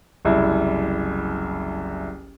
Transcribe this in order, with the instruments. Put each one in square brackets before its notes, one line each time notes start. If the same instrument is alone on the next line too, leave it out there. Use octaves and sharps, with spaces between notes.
[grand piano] F#1 C2 E4